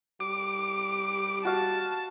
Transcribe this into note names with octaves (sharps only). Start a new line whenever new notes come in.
G3 D6
F#4 F5 A5